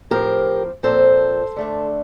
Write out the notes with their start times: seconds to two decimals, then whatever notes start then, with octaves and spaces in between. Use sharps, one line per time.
0.11 A2 F3 C4 G4 A#4
0.83 A#2 F3 C4 A4 C5
1.56 D3 A3 D4